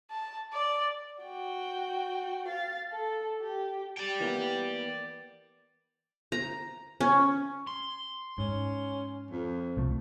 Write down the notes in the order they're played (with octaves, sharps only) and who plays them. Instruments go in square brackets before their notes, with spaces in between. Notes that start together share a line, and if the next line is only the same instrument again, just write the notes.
[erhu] A5
D5
[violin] F#4 G5
F5 A6
A4
G4
[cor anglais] G4 [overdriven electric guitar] D5 G5
[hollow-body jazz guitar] E3 A#3 B3
[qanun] A#5
C#4
[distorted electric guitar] C6
[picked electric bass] G#2 [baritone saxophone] C#4
[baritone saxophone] F2
[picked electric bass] C2 A3